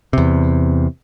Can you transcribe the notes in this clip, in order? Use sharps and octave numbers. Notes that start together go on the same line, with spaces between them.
E2 C3